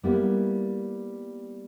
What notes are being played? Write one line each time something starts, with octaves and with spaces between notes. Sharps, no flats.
G3 A#3 B3 E4